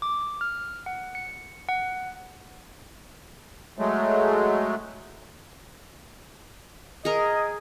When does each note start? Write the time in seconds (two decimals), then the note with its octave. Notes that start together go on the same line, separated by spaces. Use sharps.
0.02 D6
0.41 F6
0.86 F#5
1.15 C#7
1.69 F#5
3.78 F#3 G#3 A3
7.05 G#4 A#4 D#5